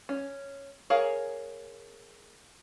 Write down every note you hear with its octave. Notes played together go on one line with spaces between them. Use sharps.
C#4
G#4 A#4 C#5 F5